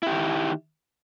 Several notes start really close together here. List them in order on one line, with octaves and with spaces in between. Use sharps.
E4 G4 D#3